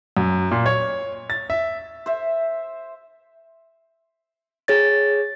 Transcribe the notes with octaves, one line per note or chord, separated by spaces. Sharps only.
F#2
A#2
C#5
A6
E5
C5 E5
G#4 C#5 A6